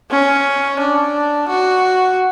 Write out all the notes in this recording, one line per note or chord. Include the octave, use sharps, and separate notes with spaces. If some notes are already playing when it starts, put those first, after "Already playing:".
C#4
D4
F#4